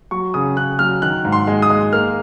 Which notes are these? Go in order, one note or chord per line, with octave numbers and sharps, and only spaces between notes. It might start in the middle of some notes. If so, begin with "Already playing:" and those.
F#3 C#6
C#3 D#6
C#3 F#6
F#3 F6
D#3 F#6
G#2
C6
G#3
D#6
G#3
A#3 F6